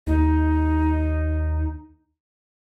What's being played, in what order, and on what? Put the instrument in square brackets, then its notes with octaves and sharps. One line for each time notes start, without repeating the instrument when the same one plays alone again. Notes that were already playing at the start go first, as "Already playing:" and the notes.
[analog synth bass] D#2 [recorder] D#4